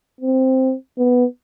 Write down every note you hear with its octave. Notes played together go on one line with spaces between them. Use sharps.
C4
B3